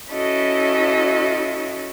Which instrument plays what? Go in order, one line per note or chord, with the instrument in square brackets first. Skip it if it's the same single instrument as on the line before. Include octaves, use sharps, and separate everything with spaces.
[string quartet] C#4 E4 F#4 A4 D#5